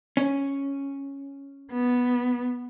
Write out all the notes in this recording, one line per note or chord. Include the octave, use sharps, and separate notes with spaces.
C#4
B3